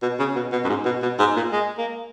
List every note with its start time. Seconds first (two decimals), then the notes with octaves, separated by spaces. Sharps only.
0.02 B2
0.19 C#3
0.35 B2
0.52 B2
0.64 F#2
0.69 G#2
0.85 B2
1.02 B2
1.19 G#2
1.36 A#2
1.52 G#3
1.78 A#3